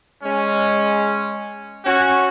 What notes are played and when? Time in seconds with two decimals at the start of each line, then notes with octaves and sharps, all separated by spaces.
0.23 G#3 C#4
1.85 C#4 F#4